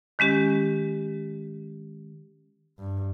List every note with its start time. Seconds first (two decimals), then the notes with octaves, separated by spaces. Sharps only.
0.19 D#3 G#3 C#4 G4
2.79 G2